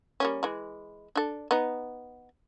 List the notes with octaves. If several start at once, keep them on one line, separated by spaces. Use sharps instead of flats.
G3 A#3 C#4
E3 G#3
D4 A4
B3 D#4